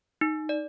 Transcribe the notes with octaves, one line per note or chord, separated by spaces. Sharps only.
D#4
D5